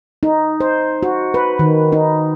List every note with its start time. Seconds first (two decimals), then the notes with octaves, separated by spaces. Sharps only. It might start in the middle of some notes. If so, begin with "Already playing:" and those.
0.23 D#4
0.60 C5
1.03 F#4
1.34 B4
1.59 D#3
1.92 D#4